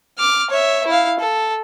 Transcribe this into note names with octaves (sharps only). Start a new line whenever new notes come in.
D6 F6
C#5 E5
E4 F5
A4